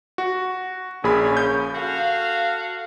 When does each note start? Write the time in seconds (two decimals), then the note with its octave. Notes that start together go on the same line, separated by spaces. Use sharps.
0.18 F#4
1.04 A#1 C#3 A#3 C#4 G#4 B5
1.37 G6
1.75 F#4 A4 F5